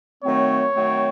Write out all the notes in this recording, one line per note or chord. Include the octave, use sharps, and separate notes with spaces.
D#3 F#3 A3 C4 C#5
D#3 F#3 A3 C4